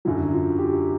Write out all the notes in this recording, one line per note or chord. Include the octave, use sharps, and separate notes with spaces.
F#2 D3 F#3 E4
F4
G4